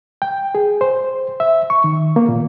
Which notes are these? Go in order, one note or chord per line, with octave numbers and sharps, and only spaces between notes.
G5
G#4
C5
E5
C#6
D#3
A#3
A#2